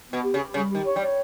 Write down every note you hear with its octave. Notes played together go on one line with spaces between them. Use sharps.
B3
B2
G4
C#3
G4
C#3 G3
D#3 G4
C#5
G3
C#5